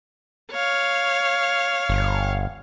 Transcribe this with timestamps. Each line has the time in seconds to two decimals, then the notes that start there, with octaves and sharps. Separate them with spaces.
0.52 C#5 F5
1.89 G1